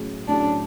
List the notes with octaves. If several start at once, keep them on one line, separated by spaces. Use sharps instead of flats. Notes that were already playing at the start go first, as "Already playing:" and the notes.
Already playing: A2 F#3 C#4 G#4
A2 F#3 C#4 D4 G#4